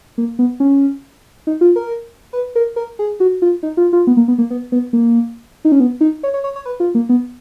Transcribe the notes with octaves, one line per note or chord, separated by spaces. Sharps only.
A#3
B3
C#4
D#4
F4
A#4
B4
A#4
A#4
G#4
F#4
F4
D#4
F4
F4
B3
A#3
B3
A#3
B3
B3
A#3
D#4
C#4
B3
D#4
C#5
C#5
C#5
C#5
B4
F4
A#3
B3